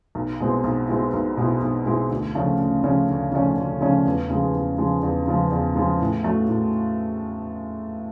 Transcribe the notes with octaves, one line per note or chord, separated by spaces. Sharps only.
B1
B2 G#3 C4 E4
B1
B2 G#3 C4 E4
B1
B2 G#3 C4 E4
B1
B2 G#3 C4 E4
D2
C#3 F3 A3 C#4
D2
C#3 F3 A3 C#4
D2
C#3 F3 A3 C#4
D2
C#3 F3 A3 C#4
E2
C#3 F3 G#3
E2
C#3 F3 G#3
E2
C#3 F3 G#3
E2
C#3 F3 G#3
A2
F#3 A3
A2